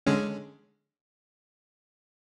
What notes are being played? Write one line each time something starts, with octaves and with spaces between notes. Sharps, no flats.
D3 G#3 C#4